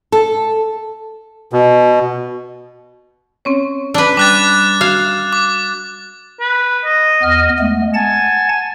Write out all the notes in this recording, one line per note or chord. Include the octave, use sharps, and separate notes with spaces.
A4
B2
C4 C#4 C#5
D4 B4
G3 D6 F#6 A6
F#4 F5 G#6
D6
B4
D#5
E2 B3 F6
G#3 A3 B3
F#5 G#5 A5 A6